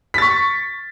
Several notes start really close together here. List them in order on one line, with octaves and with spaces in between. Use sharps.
B6 A6 C#6